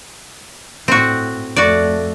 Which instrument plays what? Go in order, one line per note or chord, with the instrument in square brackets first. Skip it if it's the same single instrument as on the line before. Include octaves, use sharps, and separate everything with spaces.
[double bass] A2 [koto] C4 F#4
[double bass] F2 A3 [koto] F#4 D5